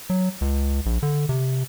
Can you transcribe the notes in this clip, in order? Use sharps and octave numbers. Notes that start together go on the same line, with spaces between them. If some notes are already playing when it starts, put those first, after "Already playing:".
F#3
C#2
A#1
D3
C3